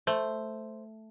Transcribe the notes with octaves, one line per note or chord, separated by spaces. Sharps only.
A3 C5